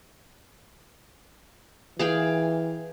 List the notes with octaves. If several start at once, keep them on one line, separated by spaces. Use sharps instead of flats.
E3 G#4 F5 G5